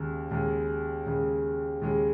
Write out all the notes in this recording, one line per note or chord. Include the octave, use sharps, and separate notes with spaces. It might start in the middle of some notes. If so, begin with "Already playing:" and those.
Already playing: D#2 C#3 G#3
D#2 C#3 G#3
D#2 C#3 G#3
D#2 C#3 G#3